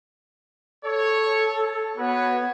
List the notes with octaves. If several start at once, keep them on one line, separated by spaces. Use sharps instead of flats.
A4 C#5
B3 F#4 B4 C#5